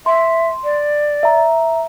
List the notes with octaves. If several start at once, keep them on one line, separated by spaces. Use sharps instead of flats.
E5 C6
D5
E5 A#5